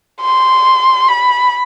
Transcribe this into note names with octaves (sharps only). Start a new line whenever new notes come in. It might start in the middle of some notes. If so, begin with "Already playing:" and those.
C6
B5